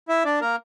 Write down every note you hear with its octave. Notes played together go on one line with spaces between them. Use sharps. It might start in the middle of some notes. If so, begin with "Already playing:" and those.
E4 E5
D4 D5
A#3 A#4